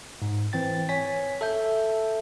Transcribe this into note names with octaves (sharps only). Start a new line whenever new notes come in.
G#2
E3 C4 G5 A6
C#5 G#5 B6
A4 E5 G6